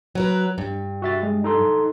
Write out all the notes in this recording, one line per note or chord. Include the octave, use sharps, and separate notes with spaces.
F#3 A#4 B4
G2
F#4 E5 A6
G#3
D#4 A4 C6